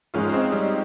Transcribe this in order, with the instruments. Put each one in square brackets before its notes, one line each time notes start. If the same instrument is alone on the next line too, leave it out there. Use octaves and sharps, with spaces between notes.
[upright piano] G#2 F3 G#3 [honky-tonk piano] C#4 F4
[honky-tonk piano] C4 D#4
G3